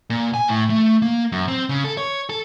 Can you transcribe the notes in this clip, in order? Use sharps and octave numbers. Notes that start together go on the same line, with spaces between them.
A#2
G#5
A2
A3
A#3
F#2
C4
C#3
A4
C#5
A4